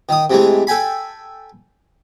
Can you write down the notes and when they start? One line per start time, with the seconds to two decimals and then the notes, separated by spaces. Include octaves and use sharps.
0.09 D#3 D#6
0.30 C3 E3 G#3 A3
0.67 A4 G5 G#5 B5